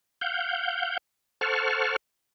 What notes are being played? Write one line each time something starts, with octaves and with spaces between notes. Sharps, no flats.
F5 F#5 G6
A4 C5 F#5 A5 C#6 F6